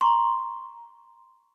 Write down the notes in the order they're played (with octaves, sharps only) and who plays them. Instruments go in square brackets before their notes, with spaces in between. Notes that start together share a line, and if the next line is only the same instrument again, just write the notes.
[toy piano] A#5 C#6 [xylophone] C6